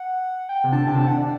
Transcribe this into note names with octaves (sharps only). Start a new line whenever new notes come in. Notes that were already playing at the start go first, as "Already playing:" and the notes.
Already playing: F#5
G5
C3
D3 A5
C3 G5
D3 A5
F#5
D5